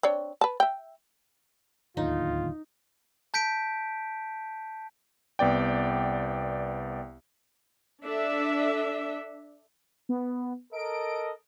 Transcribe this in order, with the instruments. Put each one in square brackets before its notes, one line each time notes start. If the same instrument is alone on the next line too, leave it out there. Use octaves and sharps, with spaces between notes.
[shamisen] C4 D4 C#5
B4 A5
E5 G5
[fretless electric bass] D1 D#2 D3 [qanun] D#4 [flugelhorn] F4
[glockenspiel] A5 G6 B6 D7
[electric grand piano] C2 B3 D5 G5
[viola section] D4 A4 E5
[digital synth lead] B3
[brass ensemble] A4 A#4 D#5 [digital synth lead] D7